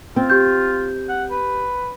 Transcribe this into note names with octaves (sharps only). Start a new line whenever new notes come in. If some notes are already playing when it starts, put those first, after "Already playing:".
C4 F4
G4 G6
F#5
B4